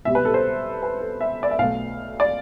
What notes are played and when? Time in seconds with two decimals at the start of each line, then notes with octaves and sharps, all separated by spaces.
0.05 C2 B2 G3 E5
0.15 B4
0.25 A4
0.34 C5
0.83 B4
1.01 A4
1.21 E5
1.43 D5
1.51 E5
1.59 B1 B2 A3 F5
2.20 D5